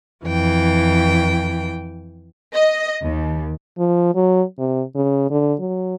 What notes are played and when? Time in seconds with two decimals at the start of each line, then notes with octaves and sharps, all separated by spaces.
0.25 F2 E3 G5
2.53 D#5
3.03 D#2
3.78 F3
4.15 F#3
4.59 C3
4.95 C#3
5.30 D3
5.59 F#3